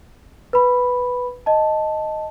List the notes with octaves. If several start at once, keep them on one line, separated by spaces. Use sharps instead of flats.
B4 B5
D#5 A5